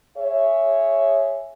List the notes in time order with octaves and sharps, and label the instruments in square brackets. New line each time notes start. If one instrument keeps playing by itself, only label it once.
[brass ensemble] G#4 C#5 E5